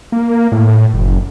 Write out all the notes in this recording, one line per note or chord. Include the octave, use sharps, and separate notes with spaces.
A#3
A2
F#1